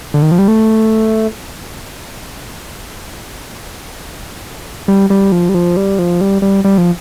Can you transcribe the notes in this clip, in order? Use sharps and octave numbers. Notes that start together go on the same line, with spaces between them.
D3
D#3
F3
G3
A3
G3
G3
F3
G3
F3
G3
F3
G3
G3
G3
F3